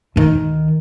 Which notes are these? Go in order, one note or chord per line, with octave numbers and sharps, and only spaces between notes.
D2 D#3